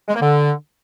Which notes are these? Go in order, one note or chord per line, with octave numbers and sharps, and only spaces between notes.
G#3
A#3
D3